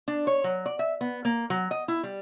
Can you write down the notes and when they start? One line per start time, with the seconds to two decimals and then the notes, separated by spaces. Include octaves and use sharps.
0.08 D4
0.27 C#5
0.44 F#3
0.66 D5
0.79 E5
1.01 B3
1.25 A#3
1.50 F#3
1.71 D#5
1.88 E4
2.03 G3